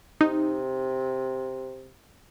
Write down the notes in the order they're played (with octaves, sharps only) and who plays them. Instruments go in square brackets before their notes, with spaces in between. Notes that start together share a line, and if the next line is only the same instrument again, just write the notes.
[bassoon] C3 [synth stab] D#4